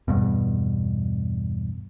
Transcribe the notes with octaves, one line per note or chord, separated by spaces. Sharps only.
E2 G2 B2